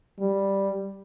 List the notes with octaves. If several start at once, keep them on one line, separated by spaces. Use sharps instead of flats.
G3